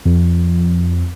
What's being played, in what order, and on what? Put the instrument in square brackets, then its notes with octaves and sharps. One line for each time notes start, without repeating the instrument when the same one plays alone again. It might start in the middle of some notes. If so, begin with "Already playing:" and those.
[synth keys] F2